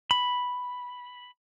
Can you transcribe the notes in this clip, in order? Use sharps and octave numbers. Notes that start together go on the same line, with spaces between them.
B5